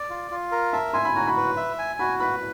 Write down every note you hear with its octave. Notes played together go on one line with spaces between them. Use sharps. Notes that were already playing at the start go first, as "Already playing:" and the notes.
Already playing: D5
F4
F4
A#4
E5 A5
G#5 C6
B5
F#4 A#5
B5
B4
E5
G#5
F#4 B5
B4 B5